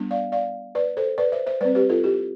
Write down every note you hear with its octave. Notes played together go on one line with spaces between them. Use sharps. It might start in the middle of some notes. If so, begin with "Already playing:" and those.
Already playing: G3 B3 D4
D5 F5
D5 F5
B4 D5
A4 C5
B4 D5
C5 E5
C5 E5
G3 C4 B4 D5
G4 B4
F4 A4
E4 G4